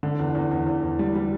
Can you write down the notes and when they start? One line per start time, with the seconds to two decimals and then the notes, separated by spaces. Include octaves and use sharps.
0.03 D3
0.19 E2
0.35 E2
0.51 E2
0.67 E2
0.83 E2
0.99 G3
1.15 G3